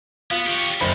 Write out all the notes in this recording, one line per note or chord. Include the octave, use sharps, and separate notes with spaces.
B3 F4
G4 C#5
F#1 B2 C5 B5